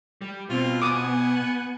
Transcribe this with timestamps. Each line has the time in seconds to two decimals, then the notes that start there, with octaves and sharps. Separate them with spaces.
0.21 G3
0.50 B2 C4 F4
0.82 B3 G#5 D6 D#6